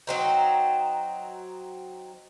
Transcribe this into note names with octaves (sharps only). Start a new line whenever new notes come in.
F#3 C4 D#4